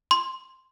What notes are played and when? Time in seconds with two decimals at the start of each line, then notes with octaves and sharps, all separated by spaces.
0.11 C6